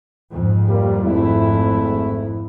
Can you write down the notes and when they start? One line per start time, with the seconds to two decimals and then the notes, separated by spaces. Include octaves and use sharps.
0.30 F2 G#2
0.69 G3 A#3
1.03 G#1 A3 E4